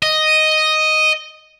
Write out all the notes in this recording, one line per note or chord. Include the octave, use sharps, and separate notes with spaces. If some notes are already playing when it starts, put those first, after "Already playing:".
D#5